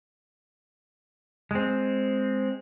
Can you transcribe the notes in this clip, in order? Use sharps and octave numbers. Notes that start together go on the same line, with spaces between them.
G#3 C4